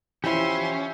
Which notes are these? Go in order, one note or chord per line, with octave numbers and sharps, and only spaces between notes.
E3 F3 C#4 E4 G4 E5 C6